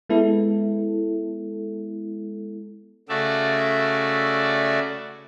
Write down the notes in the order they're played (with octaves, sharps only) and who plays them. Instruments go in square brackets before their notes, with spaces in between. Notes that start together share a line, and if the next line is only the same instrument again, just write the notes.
[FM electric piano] G#3 B3 E4 A4
[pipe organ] C#3 A3 F#4 D5 E5